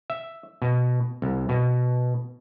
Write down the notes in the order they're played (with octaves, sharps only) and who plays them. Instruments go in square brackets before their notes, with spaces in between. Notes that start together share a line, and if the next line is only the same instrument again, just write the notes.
[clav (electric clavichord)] E5
B2
C2
B2